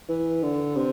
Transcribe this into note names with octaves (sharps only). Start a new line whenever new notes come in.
E3
D3
C3